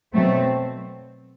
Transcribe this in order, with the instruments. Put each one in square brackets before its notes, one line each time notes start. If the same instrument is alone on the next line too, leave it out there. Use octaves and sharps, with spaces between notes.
[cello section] B2 F#3 A3 C4